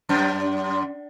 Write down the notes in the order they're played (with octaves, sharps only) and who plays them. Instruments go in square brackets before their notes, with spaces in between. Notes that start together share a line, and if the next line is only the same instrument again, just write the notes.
[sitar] F#2